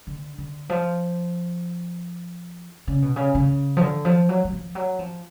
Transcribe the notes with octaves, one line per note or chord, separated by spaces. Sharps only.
D3
D3
F3
C#3
B2
C#3
C#3
F3
D3
F3
F#3
F#3
F3
F#3
F3